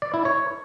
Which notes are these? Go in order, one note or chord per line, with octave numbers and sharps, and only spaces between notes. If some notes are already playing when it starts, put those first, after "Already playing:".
D5
E4
C#5